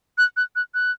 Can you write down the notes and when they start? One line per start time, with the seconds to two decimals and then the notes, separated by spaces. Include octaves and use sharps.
0.18 F#6
0.37 F#6
0.56 F#6
0.74 F#6